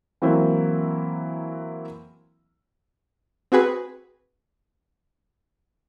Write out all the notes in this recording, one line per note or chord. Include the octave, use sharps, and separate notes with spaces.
E3 F#3 A#3 C4 E4
C4 F#4 G#4 B4